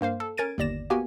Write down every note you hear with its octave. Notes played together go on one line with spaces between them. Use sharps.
G2 A#3 C5 F5
A4
C#4 A#4 G#6 A6 D7 D#7
G1 D#2 D5 A#6 E7
A#3 B3 F#4 G4 G#5